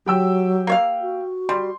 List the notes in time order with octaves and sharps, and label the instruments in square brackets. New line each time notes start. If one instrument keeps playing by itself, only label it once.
[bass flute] F#3 [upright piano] G4 G5 E6
[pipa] A#3 C#5 F5
[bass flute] F#4
[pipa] G3 [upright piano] C6